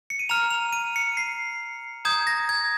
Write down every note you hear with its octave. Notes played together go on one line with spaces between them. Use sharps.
C#7
D#7
A#5 F6 F7
F7
D#7
C#7
C7
A#5 D#6 G6 G#6
A#6
G#6